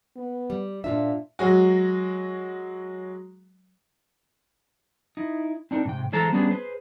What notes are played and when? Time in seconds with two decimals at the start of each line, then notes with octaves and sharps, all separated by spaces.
0.16 B3
0.50 G3
0.84 A#2 D4 F4 E5
1.39 F#3 G#3 F#4
5.17 D#4 E4
5.71 C4 D4 D#4 A#4
5.85 G#2 C3 G5
6.12 E3 G#3 G#4 A4 C5 A#5
6.32 G3 B3 C#4 D4 G4 G#4
6.51 G#4 B4 C5